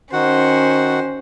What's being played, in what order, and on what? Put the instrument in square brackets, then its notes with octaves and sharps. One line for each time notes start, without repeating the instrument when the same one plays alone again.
[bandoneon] D#3 F#4 F#5 [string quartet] C#4 C5